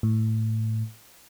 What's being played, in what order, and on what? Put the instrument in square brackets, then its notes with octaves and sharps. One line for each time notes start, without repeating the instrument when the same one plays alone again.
[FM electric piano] A2